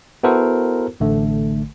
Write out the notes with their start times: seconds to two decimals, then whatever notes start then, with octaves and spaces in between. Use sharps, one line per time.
0.23 B3 E4 F#4 A4 A#4 C5
1.00 A1 D3 A3